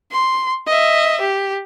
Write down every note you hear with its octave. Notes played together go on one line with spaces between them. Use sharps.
C6
D#5 E5
G4